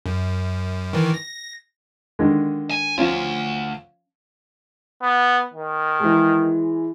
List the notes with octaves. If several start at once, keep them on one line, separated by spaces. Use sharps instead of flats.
F#2
D#3 E3
A#6
D3 D#3 G#3
G#5
D2 F3 C#4 F4
B3
D#3
E3 G#3